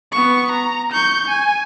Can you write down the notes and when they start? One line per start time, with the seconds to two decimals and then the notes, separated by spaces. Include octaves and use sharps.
0.12 B3 C#6
0.52 A#5
0.92 C#6 G6
1.28 G#5